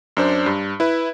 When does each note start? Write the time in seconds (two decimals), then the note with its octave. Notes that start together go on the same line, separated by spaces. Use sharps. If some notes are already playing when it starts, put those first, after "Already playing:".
0.17 F#2 D4 C5
0.46 G2
0.80 E4 B4